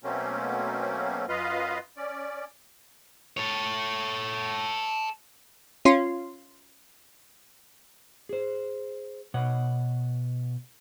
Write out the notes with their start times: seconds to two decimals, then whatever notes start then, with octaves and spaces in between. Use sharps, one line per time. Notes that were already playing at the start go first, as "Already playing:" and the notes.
0.04 B2 F#3 A3 A#3 C4 C#4
1.28 F#2 F4 B4 D#5 F5
1.97 C#4 D5
3.37 A4 C#5
5.85 C#4 F4 C6
8.29 G#4 C5
9.34 B2 C#5 D#5 F#5